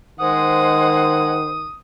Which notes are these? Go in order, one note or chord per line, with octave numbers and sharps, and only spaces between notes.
D#3 G#3 C5 F#5 D#6